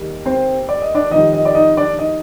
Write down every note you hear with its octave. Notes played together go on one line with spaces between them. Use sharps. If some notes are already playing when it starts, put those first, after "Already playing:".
Already playing: D#2 D#3 G3
C4 C5
D5
D#5
D4 D5
F2 D#3 G3 D#4 D#5
D#4 D#5
D5
D#4 D#5
D4 D5
D#4 D#5